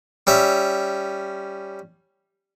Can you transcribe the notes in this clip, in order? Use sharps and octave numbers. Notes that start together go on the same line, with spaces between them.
G3 C#4 E5